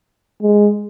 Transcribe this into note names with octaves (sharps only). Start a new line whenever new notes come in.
G#3